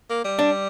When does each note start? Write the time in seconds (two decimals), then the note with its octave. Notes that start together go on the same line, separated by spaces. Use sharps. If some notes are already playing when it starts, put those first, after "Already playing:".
0.10 A#3
0.24 G3
0.39 D4